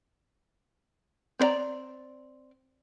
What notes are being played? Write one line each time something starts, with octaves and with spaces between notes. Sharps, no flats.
C4 C5 D5 A#5